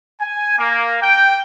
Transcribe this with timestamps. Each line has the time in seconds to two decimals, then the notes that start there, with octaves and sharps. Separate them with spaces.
0.20 G#5
0.58 A#3
1.02 G5